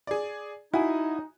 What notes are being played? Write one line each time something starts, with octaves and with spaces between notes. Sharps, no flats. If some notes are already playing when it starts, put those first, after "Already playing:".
G#4 D5
D#4 E4 F#4 G#5